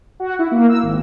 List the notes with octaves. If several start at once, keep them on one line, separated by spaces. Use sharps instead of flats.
F#4
E4
A#3
E6
G#1